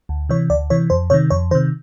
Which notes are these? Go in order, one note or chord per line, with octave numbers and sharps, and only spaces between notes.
D2
C3 E3 C#5
D2 D5
C3 E3 C#5
F2 C5
C3 D#3 C#5
F2 C#5
C3 D#3 C5